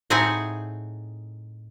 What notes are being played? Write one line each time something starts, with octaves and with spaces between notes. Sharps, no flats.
A2 C4 D#4 G#4 F#5 G#5